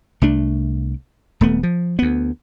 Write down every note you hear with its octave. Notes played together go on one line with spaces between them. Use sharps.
C2 A3 D4
D#1 A3 B3
F3
D2 B3